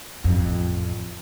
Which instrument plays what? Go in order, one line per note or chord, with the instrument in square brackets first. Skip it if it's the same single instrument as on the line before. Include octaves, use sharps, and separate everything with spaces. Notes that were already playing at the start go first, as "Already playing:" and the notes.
[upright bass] A1 F2